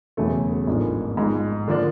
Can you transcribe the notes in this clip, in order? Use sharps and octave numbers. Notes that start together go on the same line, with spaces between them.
E1 E2 C#3 F#3 A3
A1 G#2 F3 A#3 D4
G#2 F3 G#3
D3 F3 A#3 D4